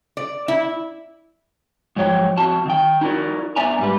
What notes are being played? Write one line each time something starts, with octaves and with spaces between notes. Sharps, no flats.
D5
E4
G#2 F3 F#3 C#5 G5
F2 F#4 A5
D#3 G5
D#4 E4 F#4 A#4 D5
B3 D4 D5 E5 G#5 A#5
G#2 G3 B4